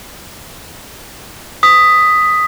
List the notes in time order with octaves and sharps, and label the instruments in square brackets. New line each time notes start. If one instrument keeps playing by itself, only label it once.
[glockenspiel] D#6 B6